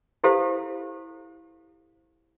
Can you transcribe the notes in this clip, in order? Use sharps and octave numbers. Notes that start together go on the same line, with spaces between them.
E4 G4 A4 C5 F5